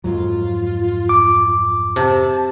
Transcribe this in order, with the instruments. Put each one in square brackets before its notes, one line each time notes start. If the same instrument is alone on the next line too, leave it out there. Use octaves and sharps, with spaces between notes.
[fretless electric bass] F2 G#2 F#3 [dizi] F4
[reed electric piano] D6
[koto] C3 [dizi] A5